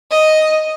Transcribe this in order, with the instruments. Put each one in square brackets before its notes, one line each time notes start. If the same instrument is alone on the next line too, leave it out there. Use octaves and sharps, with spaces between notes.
[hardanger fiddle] D#5